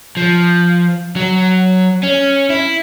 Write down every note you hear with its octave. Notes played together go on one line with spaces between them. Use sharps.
F3
F#3
C#4
E4